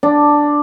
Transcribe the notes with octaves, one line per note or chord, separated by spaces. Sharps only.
D4